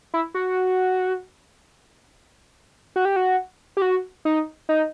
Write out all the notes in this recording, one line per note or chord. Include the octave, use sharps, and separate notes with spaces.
E4
F#4
F#4
G4
F#4
G4
F#4
D#4
D#4